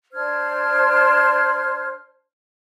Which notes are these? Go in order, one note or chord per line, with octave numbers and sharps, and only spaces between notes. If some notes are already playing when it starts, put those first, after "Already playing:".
D4 C5 F6 G#6